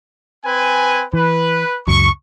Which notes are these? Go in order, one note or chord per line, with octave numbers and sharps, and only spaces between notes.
C4 B4 G#5
E3 B4
C#2 F#2 F#3 C#6